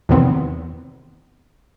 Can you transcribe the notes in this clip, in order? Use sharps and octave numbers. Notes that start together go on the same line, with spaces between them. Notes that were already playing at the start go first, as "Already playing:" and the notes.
E2 C3 D#3 B3 C4